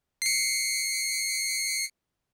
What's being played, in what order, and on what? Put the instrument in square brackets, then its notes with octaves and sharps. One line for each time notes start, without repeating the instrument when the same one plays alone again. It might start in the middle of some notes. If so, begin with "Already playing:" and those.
[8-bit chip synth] C7 C#7